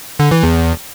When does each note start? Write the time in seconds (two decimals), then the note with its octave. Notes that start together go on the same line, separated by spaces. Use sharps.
0.19 D3
0.31 E3
0.43 E2